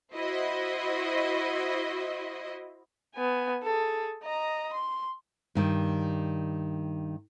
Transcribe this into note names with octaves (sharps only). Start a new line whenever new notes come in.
E4 F#4 C5 D#5
B3 G#5
G#4 A4
D#5 A#5
C6
G2 D#3 G3